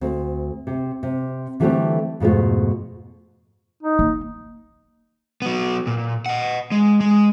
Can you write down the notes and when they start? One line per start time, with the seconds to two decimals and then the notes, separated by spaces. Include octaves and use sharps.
0.01 D2 C4
0.67 C3
1.03 C3
1.60 D3 E3 G3 A3 C4 G4
2.20 F2 G#2 B2 A3 F4
3.83 D#4
3.99 A#3
5.42 F#3 B3
5.87 A#2
6.26 D#5 F#5
6.72 G#3
7.01 G#3